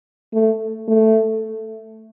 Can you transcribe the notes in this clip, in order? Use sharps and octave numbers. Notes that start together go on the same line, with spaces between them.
A3
A3